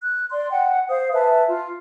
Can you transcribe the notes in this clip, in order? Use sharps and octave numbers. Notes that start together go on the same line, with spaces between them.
F#6
D5 C6
F#5 G5
C5 F5 D#6
B4 E5 G#5 A5
F4